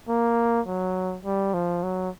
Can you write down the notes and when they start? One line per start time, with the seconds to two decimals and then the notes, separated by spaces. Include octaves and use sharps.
0.08 A#3
0.66 F#3
1.25 G3
1.54 F3
1.83 F#3